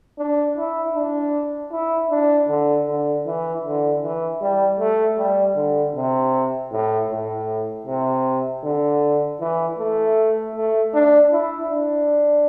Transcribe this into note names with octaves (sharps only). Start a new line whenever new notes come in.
D4
E4
D4
E4
D4
D3
D3
E3
D3
E3
G3
A3
G3
D3
C3
A2
A2
C3
D3
E3
A3
A3
D4
E4
D4